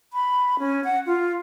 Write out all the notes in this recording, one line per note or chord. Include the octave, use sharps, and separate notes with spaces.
B5
C#4
F#5
F4